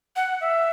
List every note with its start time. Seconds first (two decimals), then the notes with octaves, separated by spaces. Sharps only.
0.16 F#5
0.41 E5